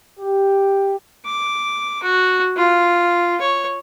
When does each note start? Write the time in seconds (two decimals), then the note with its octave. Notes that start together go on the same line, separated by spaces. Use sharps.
0.20 G4
1.26 D6
2.03 F#4
2.57 F4
3.41 C#5